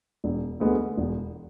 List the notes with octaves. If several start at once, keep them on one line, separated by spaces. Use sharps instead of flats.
E1
D2 D3 G#3 B3
E1